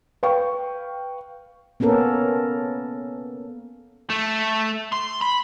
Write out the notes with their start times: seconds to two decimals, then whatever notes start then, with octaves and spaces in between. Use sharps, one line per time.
0.23 B4 F5 G5 C#6
1.80 A#3 B3 C#4 A4 A#4
4.10 A3
4.93 C6
5.23 B5